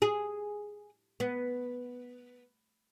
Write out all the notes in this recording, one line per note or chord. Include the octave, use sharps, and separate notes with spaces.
G#4
B3